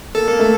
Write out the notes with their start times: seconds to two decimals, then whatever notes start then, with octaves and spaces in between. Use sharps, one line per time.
0.15 A#3 A4
0.28 A#3
0.39 A3